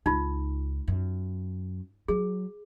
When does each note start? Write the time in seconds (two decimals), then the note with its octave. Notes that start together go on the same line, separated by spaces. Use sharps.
0.06 C#2 D#4 F4
0.88 F#2
2.08 F#3 G#4